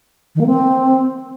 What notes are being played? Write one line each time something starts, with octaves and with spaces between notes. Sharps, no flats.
D#3
A#3
C4